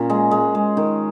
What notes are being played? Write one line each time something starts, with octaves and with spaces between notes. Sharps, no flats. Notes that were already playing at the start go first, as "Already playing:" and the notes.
Already playing: A#2 C#4
G#3
G#3
G#3
D#3